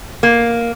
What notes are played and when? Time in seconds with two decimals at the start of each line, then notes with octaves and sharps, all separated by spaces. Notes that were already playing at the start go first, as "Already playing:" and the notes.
0.23 A#3